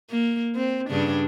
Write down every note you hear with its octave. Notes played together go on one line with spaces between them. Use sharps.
A#3
C4
G2 C#3 D4